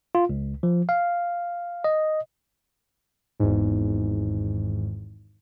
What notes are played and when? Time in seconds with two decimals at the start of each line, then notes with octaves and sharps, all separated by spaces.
0.15 F4
0.29 C#2
0.63 F3
0.89 F5
1.84 D#5
3.40 G#1 E2 G#2